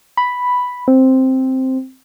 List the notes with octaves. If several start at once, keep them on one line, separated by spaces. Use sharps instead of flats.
B5
C4